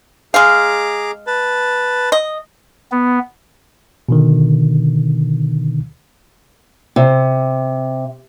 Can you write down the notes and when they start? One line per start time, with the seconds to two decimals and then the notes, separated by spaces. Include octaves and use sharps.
0.34 G#3 G#4 F5 A#5 D6
1.27 B4 A5
2.12 D#5
2.91 B3
4.09 B2 D3 D#3
6.96 C3